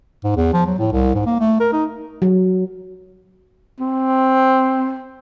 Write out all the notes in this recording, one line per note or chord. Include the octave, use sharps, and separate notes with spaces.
G#2
E2
F3
F#3
A2
C2
G#2
A#3
A3
A#4
D#4
F#3
C4